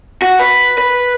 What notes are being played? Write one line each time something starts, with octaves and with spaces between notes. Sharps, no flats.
F#4
B4
B4